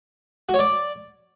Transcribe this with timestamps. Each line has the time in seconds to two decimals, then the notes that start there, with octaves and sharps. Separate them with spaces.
0.49 F#4
0.54 C#5
0.59 D5